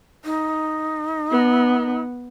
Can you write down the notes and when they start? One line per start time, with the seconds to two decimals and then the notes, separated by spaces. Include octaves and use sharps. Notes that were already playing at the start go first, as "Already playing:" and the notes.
0.25 D#4
1.31 B3